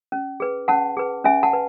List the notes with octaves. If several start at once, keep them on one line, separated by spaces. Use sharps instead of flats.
C#4
G#4 B4
C#4 F#5 A5
G#4 B4
C#4 E5 G#5
F#5 A5
B4